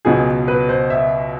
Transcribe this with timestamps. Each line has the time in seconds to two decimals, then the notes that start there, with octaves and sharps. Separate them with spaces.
0.05 C#2 B2 F#3 G#4
0.48 B4
0.69 C5
0.90 E5